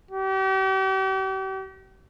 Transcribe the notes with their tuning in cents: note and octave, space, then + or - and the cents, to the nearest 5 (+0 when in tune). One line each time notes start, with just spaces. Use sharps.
G4 -40